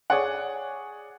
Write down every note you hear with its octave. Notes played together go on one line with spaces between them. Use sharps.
G#4 C#5 D5 F#5